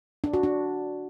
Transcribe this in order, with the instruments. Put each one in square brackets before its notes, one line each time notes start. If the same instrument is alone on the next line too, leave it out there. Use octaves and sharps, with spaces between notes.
[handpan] D4
F#4
D4